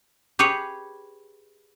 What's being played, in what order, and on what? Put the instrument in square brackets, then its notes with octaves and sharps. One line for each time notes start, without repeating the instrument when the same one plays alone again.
[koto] G4 G#4 B4 C#5